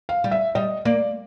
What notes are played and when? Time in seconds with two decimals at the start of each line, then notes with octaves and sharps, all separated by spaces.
0.09 F5
0.24 G3
0.31 E5
0.55 G3 D#5
0.85 A#3 D5